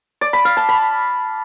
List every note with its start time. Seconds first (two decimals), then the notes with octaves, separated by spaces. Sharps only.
0.21 D5
0.33 B5
0.45 F5
0.57 A5
0.69 B5